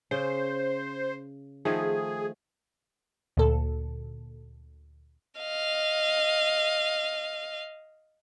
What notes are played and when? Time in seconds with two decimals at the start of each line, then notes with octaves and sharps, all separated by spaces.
0.11 C#3 C5
1.65 D#3 F3 A3 G#4
3.37 D2 A#2 A4
5.41 D#5 F5